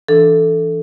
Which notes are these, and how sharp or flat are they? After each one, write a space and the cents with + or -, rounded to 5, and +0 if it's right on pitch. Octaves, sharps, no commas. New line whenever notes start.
E3 +15 D4 +0 A4 +0